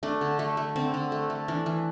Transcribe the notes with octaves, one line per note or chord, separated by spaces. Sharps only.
A3 D4
D3
A3
A3
D3 C4
D3
A3
A3
E3 D4
E3